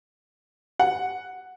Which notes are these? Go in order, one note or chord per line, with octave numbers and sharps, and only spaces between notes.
F#5